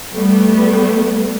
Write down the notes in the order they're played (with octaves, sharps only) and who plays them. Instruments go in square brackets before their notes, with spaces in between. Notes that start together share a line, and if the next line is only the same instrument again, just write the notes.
[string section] G3 A3 B3